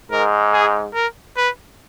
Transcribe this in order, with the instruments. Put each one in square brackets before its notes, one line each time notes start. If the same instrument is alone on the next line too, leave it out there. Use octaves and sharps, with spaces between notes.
[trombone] G#2 [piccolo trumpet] A#4
[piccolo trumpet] G#4
A#4
B4